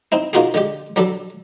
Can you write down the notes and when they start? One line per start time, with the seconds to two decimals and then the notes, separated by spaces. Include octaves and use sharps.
0.12 C4 D#4 E4
0.33 A#3 D#4 F4 F#4 G#4
0.54 D3 G#3 G4
0.96 F#3 G3 D4 A4